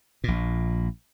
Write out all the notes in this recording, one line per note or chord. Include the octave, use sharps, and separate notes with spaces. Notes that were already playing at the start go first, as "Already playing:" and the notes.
A#1 A#2